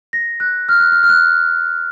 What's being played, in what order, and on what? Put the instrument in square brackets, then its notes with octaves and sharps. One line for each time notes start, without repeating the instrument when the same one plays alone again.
[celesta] A#6
F#6
F6
F#6
F6
F6
F#6